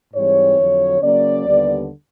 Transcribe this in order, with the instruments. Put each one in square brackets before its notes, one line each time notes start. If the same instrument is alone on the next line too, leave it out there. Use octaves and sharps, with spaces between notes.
[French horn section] G#2 E3 G3 C4 C#5
F2 D3 F#3
C#3 F#3 A#3 C#4 D5
D#2 D3 G3 B3